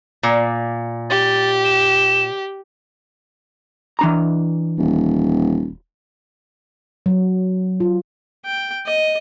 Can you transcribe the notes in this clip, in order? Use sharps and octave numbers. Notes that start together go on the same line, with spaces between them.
A#2
G4 A6
E7
E3 D4 A#5
D#1
F#3
F4
G5
D#5